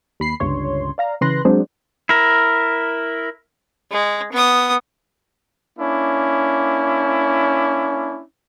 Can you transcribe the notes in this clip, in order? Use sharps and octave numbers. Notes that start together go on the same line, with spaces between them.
D#2 B5 C7
G1 C#2 G2 C#5 C6
D5 F5 A#5
C#3 E3 B4 C6 F#6 A#6
F#3 G#3 C4 D4 G#4 C5
E4 A#4
G#3
B3 D#6
A#3 C#4 D4 E4